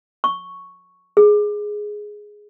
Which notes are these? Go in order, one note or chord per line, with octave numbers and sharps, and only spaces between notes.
C#6
G#4